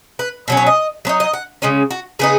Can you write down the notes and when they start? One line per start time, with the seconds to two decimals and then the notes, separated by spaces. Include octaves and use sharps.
0.19 B4
0.48 B2 F#3 C#4
0.57 C#5
0.66 D#5
1.05 F#3 B3 D#4 C#5
1.20 D#5
1.33 F#5
1.62 C#3 G#3 C#4 D#5
1.90 F#4
2.19 C#3 B3 D#4 G#4